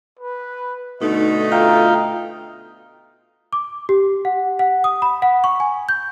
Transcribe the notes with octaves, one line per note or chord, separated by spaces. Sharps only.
B4
B2 D3 A3 D#4 D#5
F4 F5 G5 A#5
D6
G4
F#5
F#5
D#6
B5
F#5
C#6
G#5
G6